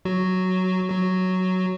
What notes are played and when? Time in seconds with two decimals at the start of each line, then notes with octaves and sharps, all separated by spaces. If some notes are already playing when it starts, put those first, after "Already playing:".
0.05 F#3 F#4
0.89 F#3 F#4